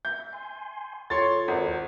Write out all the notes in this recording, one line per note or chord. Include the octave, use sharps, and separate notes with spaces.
E5 G6
G#5 C6
D#2 F4 A4 C#5 C6 A6
G#1